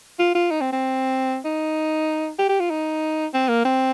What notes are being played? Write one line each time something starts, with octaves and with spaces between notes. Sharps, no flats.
F4
F4
D#4
C4
C4
D#4
G4
G4
F4
D#4
C4
A#3
C4